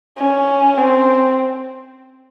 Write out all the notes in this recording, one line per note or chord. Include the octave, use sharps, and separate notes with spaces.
C#4
C4